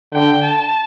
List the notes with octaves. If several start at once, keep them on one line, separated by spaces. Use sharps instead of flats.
D3 G5
A5